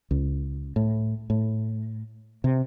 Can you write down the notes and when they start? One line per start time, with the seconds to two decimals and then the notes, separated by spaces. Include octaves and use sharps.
0.11 C#2
0.76 A2
1.30 A2
2.44 C3